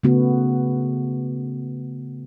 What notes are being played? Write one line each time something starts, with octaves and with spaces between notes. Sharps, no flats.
C#3 A3 B3 F#4